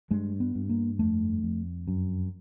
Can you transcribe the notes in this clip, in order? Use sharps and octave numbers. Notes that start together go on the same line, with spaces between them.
G2 G#3
B3
G2
A#3
F2 A3
F2
F#2